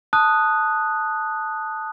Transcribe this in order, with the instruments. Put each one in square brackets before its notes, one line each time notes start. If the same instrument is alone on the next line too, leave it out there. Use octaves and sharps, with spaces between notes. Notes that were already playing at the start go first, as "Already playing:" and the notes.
[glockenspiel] A5 D#6 F#6